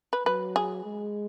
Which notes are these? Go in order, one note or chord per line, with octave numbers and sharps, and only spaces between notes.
B4
F#3 B4
G#4
G#3